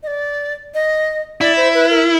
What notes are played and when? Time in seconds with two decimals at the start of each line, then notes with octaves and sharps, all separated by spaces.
0.03 D#5
0.07 D5
0.74 D#5
1.41 E4 D5
1.57 C5
1.74 B4
1.90 A#4